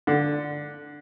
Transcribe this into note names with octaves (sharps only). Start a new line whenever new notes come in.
D3